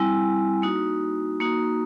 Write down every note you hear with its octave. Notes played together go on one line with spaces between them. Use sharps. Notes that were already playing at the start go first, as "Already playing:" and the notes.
Already playing: G3 C4 E4 G#5
A#3 D#4 F#4
A#3 D#4 F#4